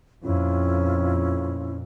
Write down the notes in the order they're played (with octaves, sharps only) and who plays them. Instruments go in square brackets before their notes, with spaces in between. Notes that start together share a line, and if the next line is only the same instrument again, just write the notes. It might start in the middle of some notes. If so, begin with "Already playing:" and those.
[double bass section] F2 A#2 [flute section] C#4 E4 F4